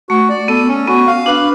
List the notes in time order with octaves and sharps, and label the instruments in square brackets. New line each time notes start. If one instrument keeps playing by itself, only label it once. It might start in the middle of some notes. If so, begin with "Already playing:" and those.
[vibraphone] A3 [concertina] F#4
[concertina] D5
[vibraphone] B3 [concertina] A4
[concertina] C#4
[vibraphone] B3 [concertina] F#4
[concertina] F5
[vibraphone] D4 [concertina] B4